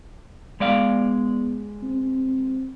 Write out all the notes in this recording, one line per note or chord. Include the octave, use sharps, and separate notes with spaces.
G#3 B3 D5 F5
C4